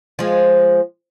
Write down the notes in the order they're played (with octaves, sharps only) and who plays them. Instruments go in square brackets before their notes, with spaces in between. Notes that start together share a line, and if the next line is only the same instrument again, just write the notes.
[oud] F3 G#3